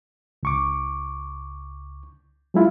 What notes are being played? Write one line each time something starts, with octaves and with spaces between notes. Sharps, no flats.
C#2 C#6 D6
F#3 G#3 E4 F4